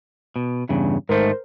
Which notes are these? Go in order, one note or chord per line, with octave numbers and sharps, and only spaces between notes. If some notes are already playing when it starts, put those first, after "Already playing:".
B2
E2 G2 C#3
G#2 D#3 A3 A#4 C5